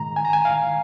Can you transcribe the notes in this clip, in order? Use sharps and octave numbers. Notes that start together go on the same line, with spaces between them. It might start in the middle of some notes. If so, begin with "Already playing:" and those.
Already playing: G#2 D#3 G#3 A#5
G#5
A#5
G#5
F5